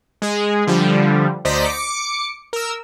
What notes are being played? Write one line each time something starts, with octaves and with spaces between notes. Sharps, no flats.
G#3 G#4
D3 F3 G3
D2 C5 D5 D#5 A#5 B6
D6 C#7
A#4 E6